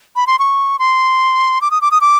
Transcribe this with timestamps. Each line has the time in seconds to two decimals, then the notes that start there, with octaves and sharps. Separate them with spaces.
0.16 B5
0.27 C6
0.39 C#6
0.79 C6
1.61 D6
1.71 D#6
1.82 D6
1.91 D#6
2.01 D6